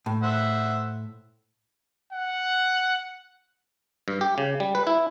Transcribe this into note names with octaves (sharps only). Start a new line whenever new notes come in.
A2
C5 E5 F#5
F#5
G2
G4
C#3
G3
B4
E4